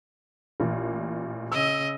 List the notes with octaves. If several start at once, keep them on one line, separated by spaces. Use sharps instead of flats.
A1 A#2
C#3 D#5 E6